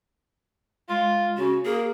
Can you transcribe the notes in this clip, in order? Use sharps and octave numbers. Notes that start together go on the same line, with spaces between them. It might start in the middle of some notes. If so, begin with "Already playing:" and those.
G#3 F4
C#3 F#4
A#3 G#4